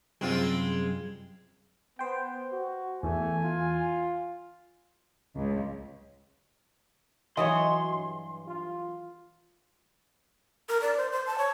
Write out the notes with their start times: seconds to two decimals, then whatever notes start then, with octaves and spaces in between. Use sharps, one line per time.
0.21 F#2 C3 G3 G#3 C4 F4
1.99 B3 C5 G5
2.52 F#4
3.03 E2 A3 G#5
3.44 F4
5.36 C#2
7.37 E3 F#3 F#4 C#5 D#5 C6
7.90 G2
8.47 F4
10.69 A#4
10.82 D5
10.97 C5
11.12 C5
11.26 A5
11.38 C#5